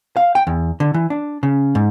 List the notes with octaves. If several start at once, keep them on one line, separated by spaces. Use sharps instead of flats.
F5
G5
E2
D3
E3
D4
C#3
G#2